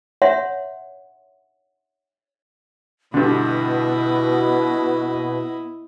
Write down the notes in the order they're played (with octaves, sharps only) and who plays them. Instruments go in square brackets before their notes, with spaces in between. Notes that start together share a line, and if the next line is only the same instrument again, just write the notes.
[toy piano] C#5 E5 F#5 C6
[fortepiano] G2 D3 [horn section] B2 [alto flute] B3 [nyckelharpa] E4 D#5